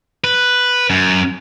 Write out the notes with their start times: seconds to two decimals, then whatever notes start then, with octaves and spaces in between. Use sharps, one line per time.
0.24 B4
0.90 F#2